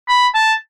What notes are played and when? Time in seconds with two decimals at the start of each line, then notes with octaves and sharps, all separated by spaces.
0.08 B5
0.34 A5